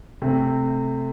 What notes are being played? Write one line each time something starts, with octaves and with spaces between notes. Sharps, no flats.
C3 A3 C4